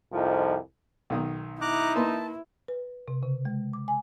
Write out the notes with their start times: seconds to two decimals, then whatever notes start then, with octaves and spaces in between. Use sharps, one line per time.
0.12 C2 F2 F3 D#4
1.10 B1 D#3 D#6
1.61 D#4 E4 A#5 D6 F#6
1.96 A#3 B4 A5 C6
2.68 B4
3.08 C3
3.23 C#3
3.45 G#3
3.73 D6
3.88 G#5